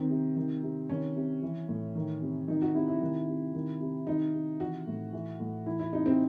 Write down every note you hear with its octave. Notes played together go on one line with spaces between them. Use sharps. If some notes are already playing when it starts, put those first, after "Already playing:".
Already playing: D#3 C4
C3
D#3
C3
D#3 C#4
C3
E3
A2
D#3
C3
D#3 D#4
F#4
C3 E4
E4
D#3
C3
D#3
C3
D#3 D#4
C3
E3 F#4
A2
E3
A2
E3 E4
E4
C3 D#4
C4